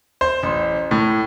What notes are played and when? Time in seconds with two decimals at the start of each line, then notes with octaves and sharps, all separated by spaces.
0.21 C5
0.43 A1
0.91 A2